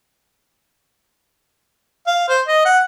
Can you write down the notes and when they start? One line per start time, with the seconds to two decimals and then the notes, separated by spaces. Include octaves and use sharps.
2.07 F5
2.29 C5
2.48 D#5
2.65 F#5